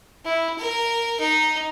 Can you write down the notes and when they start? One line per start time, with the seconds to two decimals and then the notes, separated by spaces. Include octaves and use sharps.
0.24 E4
0.58 A#4
1.20 D#4